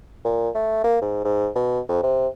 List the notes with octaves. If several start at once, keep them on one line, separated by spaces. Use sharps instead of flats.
A#2
A3
A#3
G#2
G#2
B2
F2
C3